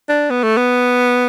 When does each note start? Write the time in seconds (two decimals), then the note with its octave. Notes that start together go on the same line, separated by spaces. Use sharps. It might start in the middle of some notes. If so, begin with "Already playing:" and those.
0.09 D4
0.30 B3
0.43 A3
0.57 B3